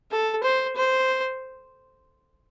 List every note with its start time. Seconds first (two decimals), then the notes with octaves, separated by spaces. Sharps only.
0.11 A4
0.44 C5
0.76 C5